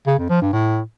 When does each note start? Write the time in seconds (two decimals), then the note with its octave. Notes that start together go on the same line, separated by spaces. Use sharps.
0.07 C#3
0.18 F2
0.30 F3
0.41 G2
0.53 A2